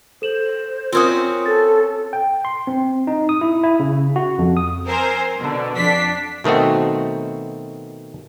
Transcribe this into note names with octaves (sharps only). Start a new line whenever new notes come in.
A4 C5 E7 F#7
C4 C#4 F4 F#4 A#4 D#6
A4 A6
G5
C6
C4
D#4
D#6
E4
E4
C#3
F#4
F2
D#6
C4 A#4 C5 G#5
B2 D3
F2 D4 B6 C7
B2 D#3 A3 C4 F#4